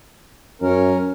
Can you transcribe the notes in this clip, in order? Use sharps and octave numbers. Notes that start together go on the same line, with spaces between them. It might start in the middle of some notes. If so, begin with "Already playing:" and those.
F#2 C#4 A#4